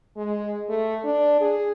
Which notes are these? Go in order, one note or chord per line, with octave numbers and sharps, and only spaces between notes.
G#3
A3
D4
G#4